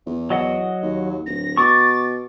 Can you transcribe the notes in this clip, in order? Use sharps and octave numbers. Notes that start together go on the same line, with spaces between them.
E2
F#3 D#5 F#5
D#2
D1 A#6
B2 C#6 D6 A6